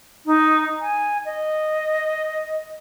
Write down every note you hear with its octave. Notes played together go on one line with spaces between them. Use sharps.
D#4
G#5
D#5